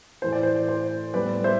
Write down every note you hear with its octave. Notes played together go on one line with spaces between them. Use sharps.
A2 E3 A3 C5
D5
C5
C5
A2 G3 B3 B4 D5
C5 E5